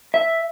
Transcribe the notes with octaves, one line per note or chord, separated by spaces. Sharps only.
E5